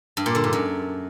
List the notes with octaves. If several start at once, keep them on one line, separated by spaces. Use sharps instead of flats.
G2
A#2
D3
G#2
F#2